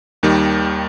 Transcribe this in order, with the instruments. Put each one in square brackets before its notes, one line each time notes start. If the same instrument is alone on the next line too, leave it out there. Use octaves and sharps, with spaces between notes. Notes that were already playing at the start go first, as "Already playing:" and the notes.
[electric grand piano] D#2 D#3 G3